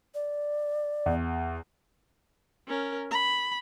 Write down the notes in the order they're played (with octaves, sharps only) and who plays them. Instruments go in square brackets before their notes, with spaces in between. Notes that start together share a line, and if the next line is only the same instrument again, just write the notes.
[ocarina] D5
[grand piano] E2
[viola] C#4 A#4
B5